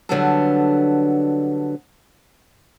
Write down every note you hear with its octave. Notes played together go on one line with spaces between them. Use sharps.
D3 F#3 G3 B3 D4 A4